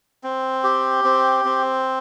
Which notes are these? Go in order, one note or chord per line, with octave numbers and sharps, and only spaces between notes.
C4
G4
C4
C4